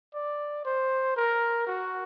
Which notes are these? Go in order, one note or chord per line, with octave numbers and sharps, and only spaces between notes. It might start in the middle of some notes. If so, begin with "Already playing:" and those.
D5
C5
A#4
F#4